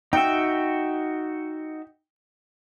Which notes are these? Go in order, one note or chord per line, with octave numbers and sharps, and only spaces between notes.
D#4 F#4 E5 G5